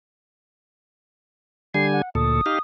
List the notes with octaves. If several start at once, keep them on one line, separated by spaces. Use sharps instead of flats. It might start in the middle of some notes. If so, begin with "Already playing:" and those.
D3 G3 G#5 C7
F#5
D2 A#2 A4 D#6
D#4 G4 F5